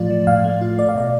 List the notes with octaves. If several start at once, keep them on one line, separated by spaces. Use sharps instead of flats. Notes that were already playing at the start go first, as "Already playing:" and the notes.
Already playing: A2 F3 A3 F4 D5
F3
A2 F5
A3
F4
A3 D5
F5
B2 D5